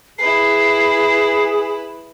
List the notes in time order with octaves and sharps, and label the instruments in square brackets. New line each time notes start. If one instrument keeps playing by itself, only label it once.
[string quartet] E4 B4 [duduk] G#4 [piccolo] C7